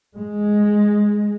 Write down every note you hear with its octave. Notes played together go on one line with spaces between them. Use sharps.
G#3